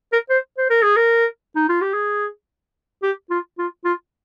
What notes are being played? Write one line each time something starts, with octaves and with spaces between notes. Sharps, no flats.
A#4
C5
C5
A#4
G#4
A#4
D#4
F4
G4
G#4
G4
F4
F4
F4